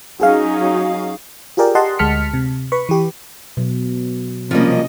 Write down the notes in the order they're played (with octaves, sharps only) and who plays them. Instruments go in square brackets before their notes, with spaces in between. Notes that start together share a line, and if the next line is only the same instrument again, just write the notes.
[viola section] F#3 C#4 D#4 [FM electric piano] F#4 G#4 F5
[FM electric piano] F4 G4 G#4 A#4 D5 G5
G4 D#5 F#5 A5 C6
D2 G#3 A5 F6 B6 C#7
C3
B4 B5 C#6
E3 G4
[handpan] B2 F#3
[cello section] C3 C#4 D#5 [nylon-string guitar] F3 G3 A#3